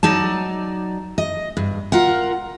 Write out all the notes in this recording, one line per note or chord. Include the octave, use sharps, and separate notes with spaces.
F#3 D#4 D5 A5
D#5
G2
F4 A#4 F#5